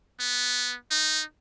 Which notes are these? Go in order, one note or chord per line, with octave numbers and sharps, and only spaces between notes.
B3
D#4